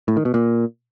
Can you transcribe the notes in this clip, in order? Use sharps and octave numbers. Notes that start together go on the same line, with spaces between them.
A2
D#3
B2
A#2